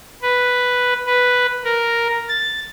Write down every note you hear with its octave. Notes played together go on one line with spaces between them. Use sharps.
B4
B4
A#4
A6